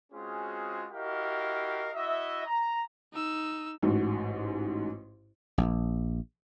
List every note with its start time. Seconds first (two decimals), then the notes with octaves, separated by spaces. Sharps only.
0.13 G#3 C4 C#4 F4 F#4 G#4
0.91 E4 F#4 G4 A#4 D#5 F5
1.94 E4 F#4 D#5 E5
2.44 A#5
3.13 D#4 E6
3.82 A1 G#2 F#4
5.58 A#1